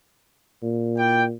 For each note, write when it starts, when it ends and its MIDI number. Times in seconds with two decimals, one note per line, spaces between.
0.63 1.33 46
0.98 1.24 64
0.98 1.24 74
0.98 1.24 79